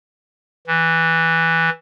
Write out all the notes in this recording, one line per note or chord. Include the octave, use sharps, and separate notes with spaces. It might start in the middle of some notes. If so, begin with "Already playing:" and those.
E3